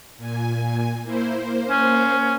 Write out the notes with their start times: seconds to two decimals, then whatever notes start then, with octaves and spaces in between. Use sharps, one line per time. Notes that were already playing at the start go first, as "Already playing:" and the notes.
0.18 A#2 G#5
1.03 A#3 E4 C5
1.38 A#3 C5
1.70 C#4